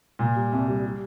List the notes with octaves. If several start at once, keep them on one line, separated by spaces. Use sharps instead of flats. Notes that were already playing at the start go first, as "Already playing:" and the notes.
A#2
G3
C2
G3
G3